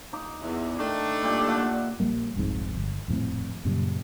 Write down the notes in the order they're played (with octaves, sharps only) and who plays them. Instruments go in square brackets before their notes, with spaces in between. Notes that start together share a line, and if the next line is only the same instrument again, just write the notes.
[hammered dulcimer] D#4 D6
[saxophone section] E2
[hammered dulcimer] D#3 [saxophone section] A3 D4
[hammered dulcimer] A#2 G3 G4
E5 F#5
[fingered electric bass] A#1 G3 A#3
F1 C2 F2 G#2
G1
D#1 F2 A2 C4
F#2 A#2 C#3 G3